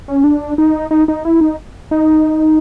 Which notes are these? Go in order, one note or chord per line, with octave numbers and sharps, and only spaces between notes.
C#4
D4
D#4
D#4
D#4
E4
D#4
D#4